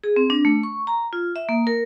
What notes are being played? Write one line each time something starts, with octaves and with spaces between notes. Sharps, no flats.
G#4
C4
D4
A3
C#6
A#5
F4
E5
A#3
A#4